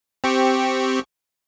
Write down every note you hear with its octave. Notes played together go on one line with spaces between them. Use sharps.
C4 G4 C#6